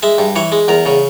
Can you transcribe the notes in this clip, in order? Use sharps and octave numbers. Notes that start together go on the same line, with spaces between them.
G#3 E5
G2
E3 C#5
G#3
E2 A#4
C#3